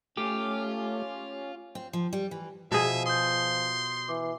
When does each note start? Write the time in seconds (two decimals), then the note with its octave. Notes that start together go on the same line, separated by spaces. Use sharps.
0.17 A3 C#4 F4 G4
1.75 C4
1.93 F3
2.13 G3
2.31 E3
2.72 B2 F3 G#4 E5
3.06 C6 D#6 G6
4.08 E3 D6